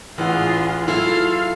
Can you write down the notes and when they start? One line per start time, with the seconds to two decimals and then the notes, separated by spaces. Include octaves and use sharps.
0.18 A1 E3 F4 G#4 F#5
0.88 F#3 E4 F4 A4 F5